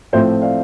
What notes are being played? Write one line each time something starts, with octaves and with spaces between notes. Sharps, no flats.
A2 F3 A3 C4 C5 E5
D5 F5